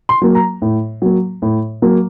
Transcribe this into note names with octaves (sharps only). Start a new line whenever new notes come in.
C6
F#3 A#3
A#5
A2
F#3 A#3
A2
F#3 A#3